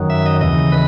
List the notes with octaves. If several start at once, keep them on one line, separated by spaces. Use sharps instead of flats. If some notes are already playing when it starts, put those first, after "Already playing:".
Already playing: F#2 D#3 F#3
E5
D#5
D#2 C#3 E3 D#5
B4